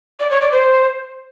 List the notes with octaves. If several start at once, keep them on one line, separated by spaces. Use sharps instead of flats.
D5
C#5
D5
C5